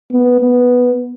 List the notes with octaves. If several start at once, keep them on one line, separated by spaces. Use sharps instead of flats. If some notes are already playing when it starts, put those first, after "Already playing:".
B3
B3